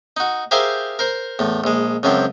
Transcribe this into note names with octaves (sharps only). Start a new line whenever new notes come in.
D#4 F#4
G4 G#4 A#4 C5 E5 F5
A#4 C5
E2 A2
A#1 G#3
C#2 F#2 F3 F#3 C4